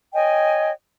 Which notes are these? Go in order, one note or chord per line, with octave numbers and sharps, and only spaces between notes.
C#5 D#5 G5 G#5